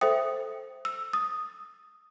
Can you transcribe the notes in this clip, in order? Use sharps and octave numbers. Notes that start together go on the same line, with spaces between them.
A4 C5 E5 G5 D#6
E6
D#6